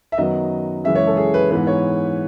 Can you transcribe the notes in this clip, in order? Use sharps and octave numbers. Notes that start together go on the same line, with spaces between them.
E5
F#2 D#3 F#3 B3 D#5
F#2 C#3 E3 G#3 E5
C#5
A4
G#4
B4
G#2 E3 B3 B4
C#5